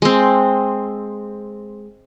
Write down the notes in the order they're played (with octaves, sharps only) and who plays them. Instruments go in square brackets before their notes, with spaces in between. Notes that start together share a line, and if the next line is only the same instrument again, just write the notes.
[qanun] G#3 C4